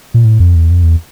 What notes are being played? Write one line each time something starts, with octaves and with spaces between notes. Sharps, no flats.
A#2
A2
F2
E2
F2
E2